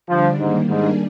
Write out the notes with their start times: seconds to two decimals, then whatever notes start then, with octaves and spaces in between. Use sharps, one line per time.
0.08 D3 F3 G3 D4
0.38 G#2 D#3 G3 A#3
0.67 G#2 D#3 G3 A#3 D4 G#4